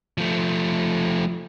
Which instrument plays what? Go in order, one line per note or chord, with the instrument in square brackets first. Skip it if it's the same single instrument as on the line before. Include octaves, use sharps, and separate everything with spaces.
[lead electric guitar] F3 A3